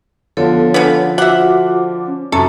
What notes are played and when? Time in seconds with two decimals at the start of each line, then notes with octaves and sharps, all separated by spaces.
0.37 D3 F3 B3 A4 C#5
0.74 C#3 B3 D4
1.18 F4 F#4 C5 E5 F#5 D6
2.07 C#4
2.32 F#2 C3 A4 A#5 C#6